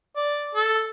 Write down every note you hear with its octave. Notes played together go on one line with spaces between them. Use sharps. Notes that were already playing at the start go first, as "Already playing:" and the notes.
D5
A4